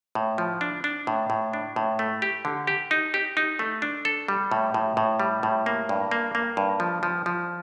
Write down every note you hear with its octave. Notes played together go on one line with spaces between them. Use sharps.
A2
F3
D4
D4
A2
A2
D4
A2
A3
G4
D3
G4
D#4
G4
D#4
A3
D4
A4
G3
A2
A2
A2
G3
A2
A#3
G2
A#3
A#3
G2
F3
F3
F3